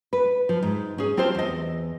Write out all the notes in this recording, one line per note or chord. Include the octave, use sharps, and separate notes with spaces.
B4
F3
G#2
C#4 G#4
C4 F4 G4 C5 A5
E2 D#5